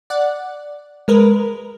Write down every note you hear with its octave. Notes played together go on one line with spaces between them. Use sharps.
D5 F#5
G#3 A#4 B4